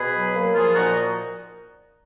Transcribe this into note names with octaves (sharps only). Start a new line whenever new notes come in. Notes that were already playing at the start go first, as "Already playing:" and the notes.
Already playing: B2 G#4 B4
F#3
A#3
F3 F4 G#4
A#2 D#4 F#4